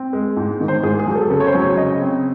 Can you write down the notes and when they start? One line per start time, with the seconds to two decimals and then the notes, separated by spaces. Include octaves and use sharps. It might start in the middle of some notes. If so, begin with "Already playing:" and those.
Already playing: C4
0.13 G#3
0.37 G#2
0.61 D#3
0.68 C5
0.83 G#2 G#4
0.99 G#4
1.07 F#3
1.15 A4
1.30 C#3 A4
1.40 C#5
1.47 C5
1.55 F#3
1.62 C#5
1.77 C#3 D#5
2.02 C4